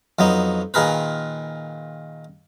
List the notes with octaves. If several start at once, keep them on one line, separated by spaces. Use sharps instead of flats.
F2 F#3 B3 D#4
A#2 D#3 G#4 A#4 B4